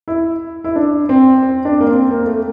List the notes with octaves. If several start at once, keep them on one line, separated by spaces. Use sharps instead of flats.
E4
E4
D4
C4
C4
D4
A#3
C4
A#3
A3